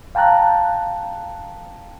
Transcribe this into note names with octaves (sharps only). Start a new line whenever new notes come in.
F5 G5 A5 A#5 F#6